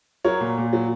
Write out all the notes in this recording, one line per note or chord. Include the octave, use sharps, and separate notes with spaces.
F#3 A#4 C#5
A#2
A#2
F#3